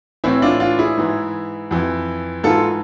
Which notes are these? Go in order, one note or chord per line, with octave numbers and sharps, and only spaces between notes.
A2 E3 C4 E4
D4 F4
D4 F4
E4 G#4
G#2 E3
F2 E3
G#2 E3 F4 A4